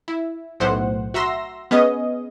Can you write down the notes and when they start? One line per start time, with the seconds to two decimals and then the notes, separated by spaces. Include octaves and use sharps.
0.08 E4
0.60 B1 A2 C5 F#5
1.14 F#4 E5 A#5 C6 E6 A#6
1.71 B3 C#4 G#4 D#5